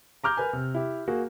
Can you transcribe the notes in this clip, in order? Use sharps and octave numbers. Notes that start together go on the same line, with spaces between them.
A#5 D6 F6 G6
A#4 B4 G#5
C3
E4 G4
A#3 F#4 G#4